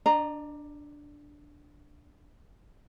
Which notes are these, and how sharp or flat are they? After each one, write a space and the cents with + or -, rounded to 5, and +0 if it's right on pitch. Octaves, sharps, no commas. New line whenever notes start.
D4 +0 D#5 -45 A#5 +0